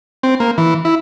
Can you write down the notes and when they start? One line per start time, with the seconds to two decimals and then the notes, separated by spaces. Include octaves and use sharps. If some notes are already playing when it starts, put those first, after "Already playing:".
0.23 C4
0.40 A#3
0.58 E3
0.85 E4